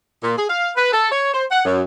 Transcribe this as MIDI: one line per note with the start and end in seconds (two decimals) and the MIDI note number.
0.22 0.36 46
0.37 0.44 68
0.49 0.71 77
0.76 0.90 71
0.92 1.07 69
1.11 1.30 73
1.34 1.44 72
1.51 1.65 78
1.65 1.82 42